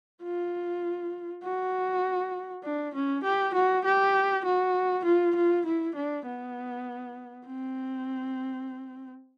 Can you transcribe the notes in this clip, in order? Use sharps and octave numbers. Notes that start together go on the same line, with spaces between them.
F4
F#4
D4
C#4
G4
F#4
G4
F#4
F4
F4
E4
D4
B3
C4